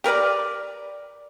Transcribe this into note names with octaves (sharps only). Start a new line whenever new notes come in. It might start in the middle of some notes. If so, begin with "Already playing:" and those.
G4 A#4 B4 D5